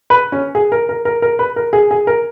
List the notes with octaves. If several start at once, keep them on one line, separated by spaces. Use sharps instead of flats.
B4
C#4
G#4
A#4
A#4
A#4
A#4
B4
A#4
G#4
G#4
A#4